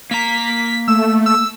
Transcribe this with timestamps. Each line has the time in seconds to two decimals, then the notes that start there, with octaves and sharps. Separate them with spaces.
0.11 A#3 A#5 B6
0.88 A3 E6
1.26 E6